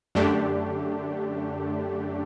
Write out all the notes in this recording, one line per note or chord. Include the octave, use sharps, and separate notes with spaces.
F#2 D3 A3 D4 G4